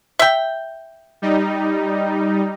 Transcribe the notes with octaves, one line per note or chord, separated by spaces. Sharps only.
E5 G5
G3 D#4